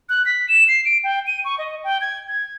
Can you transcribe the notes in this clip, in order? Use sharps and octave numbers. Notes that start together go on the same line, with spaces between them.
F#6
B6
E7
C7
D7
G5
D#7
C#6
D#5
G5
G#6
G#6